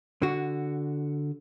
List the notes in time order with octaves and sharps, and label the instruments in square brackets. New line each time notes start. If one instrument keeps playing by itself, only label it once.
[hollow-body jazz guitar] D3 F#4